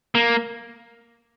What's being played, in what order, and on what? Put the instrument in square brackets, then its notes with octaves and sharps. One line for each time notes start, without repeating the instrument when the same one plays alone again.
[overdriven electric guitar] A#3